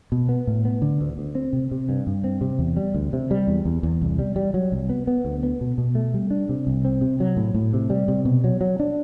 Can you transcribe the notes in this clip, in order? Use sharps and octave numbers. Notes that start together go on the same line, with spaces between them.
B2
B3
A2
B3
D3
D2
D2
C4
C3
C3
G2
G2
C4
C3
E2
G3
D2
C3
G3
E2
E2
E2
C2
G3
G3
F#3
C2
B3
B3
D2
B3
B2
B2
A3
G3
D4
C3
C2
C4
C3
F#3
A2
A2
C3
G3
C3
B2
F#3
F#3
D4